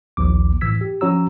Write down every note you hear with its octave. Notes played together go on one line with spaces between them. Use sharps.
A#1 D#2 D6
A2 E3 E6 G#6 B6
G4
F3 C#4 F#4 C#5 A#5 E6